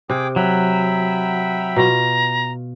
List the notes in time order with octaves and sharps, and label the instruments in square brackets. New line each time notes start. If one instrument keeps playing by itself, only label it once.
[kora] C3 [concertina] G#4 G5 D6
[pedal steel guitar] F#3 [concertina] E5 G5 B5
[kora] B2 F4 [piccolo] A#5